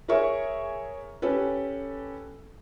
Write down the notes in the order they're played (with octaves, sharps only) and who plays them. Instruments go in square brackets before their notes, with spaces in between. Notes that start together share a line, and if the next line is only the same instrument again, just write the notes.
[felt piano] G#4 A#4 C#5 E5 C#6
C#4 G4 A4 B4